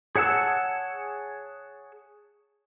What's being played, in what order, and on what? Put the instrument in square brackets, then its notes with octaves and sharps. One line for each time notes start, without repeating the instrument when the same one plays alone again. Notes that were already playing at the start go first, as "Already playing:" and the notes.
[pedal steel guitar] G#4 C#5 F#5 A5 E6